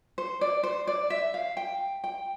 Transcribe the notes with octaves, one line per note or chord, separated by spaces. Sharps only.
C5
D5
C5
D5
E5
F5
G5
G5